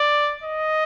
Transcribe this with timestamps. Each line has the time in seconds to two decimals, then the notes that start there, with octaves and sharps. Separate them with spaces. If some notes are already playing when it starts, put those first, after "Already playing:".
Already playing: D5
0.43 D#5